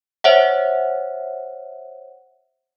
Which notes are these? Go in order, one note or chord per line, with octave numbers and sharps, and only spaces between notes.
C5 C#5 E5 F#5